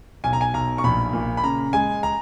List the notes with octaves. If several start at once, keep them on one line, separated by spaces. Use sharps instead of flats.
B1 G#5
A#5
G#5
B1 A#5
C#6
A#1 B5
A#2
B5
C#3 A#5
G#3 G#5
A#5